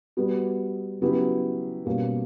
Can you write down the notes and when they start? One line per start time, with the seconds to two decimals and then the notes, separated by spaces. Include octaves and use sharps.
0.17 G3 B3 F#4
1.01 C#3 F#3 B3 E4 G4
1.86 B2 G3 A#3 C#4